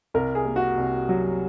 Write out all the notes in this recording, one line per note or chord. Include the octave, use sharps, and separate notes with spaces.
C2 A#4
G#4
A#3
F#4
C2
F#3